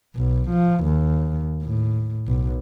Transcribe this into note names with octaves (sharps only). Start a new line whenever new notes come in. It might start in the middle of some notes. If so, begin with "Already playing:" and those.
B1
F3
D#2
A2
B1